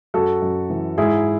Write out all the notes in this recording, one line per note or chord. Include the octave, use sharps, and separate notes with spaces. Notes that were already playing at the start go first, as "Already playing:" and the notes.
F#2 F#4 A4
F#2
E3
G#2 E4 G#4